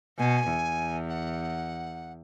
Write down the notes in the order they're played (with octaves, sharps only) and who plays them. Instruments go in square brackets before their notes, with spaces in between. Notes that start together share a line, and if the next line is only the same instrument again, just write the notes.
[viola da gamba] B2 [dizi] G#5
[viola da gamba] E2
[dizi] F#5